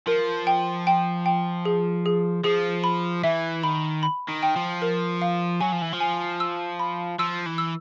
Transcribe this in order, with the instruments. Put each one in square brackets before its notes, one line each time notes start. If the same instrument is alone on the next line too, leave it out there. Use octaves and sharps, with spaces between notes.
[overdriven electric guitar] F3 [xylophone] A#4
[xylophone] G5
G5
G5
G#4
G#4
[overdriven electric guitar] F3 [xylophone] G#4
[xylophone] B5
[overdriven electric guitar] E3 [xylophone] E5
[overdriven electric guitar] D#3 [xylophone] B5
[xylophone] B5
[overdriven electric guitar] D#3
[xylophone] G5
[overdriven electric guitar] F3
[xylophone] A#4
F5
[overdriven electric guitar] F#3 [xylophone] G#5
[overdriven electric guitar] F3
E3
F3
[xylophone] G#5
E6
B5
[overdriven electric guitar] F3 [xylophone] E6
[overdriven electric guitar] E3
[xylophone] E6